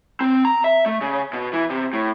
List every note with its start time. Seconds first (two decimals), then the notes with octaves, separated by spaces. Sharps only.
0.21 C4
0.45 A#5
0.64 E5
0.86 A3
1.01 C#3
1.33 B2
1.53 E3
1.70 C3
1.93 A2